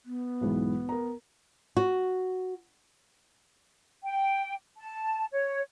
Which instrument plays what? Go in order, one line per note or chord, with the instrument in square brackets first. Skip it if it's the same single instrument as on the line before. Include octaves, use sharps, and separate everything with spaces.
[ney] B3
[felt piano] B1 G#2 E3
A#4 A#5
[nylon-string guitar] F#4
[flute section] G5
A5
C#5